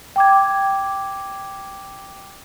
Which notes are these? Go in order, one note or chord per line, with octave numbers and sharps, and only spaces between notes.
G5 D6 G#6